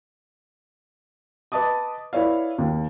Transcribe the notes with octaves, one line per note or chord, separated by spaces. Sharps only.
B4 D#5 A5 D6 D#6
E4 B4 C#5 D5 F5
D#2